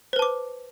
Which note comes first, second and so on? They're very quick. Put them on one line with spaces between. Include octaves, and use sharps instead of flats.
C5 B4 A5 D6